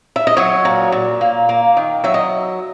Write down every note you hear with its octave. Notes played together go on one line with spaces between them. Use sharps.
E5
D#5
F#3 C#5
A#2
A#2
A#3
A#3
D#3
F#3 E5
D#5